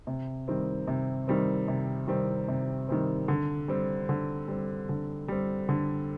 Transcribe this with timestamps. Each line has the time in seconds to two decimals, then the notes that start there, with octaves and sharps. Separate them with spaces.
0.07 C3
0.48 D#3 G3 C4
0.88 C3
1.27 D#3 G3 C4
1.68 C3
2.08 D#3 G3 C4
2.48 C3
2.88 D#3 G3 C4
3.28 D3
3.68 G3 C4
4.09 D3
4.48 G3 C4
4.89 D3
5.28 G3 C4
5.69 D3